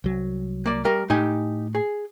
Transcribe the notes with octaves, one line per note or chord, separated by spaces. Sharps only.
C2 F#3
A#3 D5
G3 A#4
A2 D#4 G4 G#5
G#4